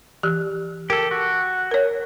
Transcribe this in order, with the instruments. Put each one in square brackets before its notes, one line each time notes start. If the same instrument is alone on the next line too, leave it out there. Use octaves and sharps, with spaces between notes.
[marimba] E3 G4 F#6
[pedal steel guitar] G4 A4 [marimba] A#4
[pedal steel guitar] F#4
[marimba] A#4 C#5